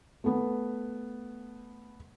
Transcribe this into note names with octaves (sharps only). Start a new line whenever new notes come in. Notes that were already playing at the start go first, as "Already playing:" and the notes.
A3 B3